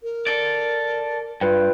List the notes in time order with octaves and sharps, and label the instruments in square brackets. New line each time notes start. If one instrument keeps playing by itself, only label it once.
[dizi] A#4
[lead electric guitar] A4 D5
[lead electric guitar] G2 [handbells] F4 B4 G5